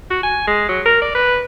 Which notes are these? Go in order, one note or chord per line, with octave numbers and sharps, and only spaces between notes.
F#4
G#5
G#3
F#3
A#4
D5
B4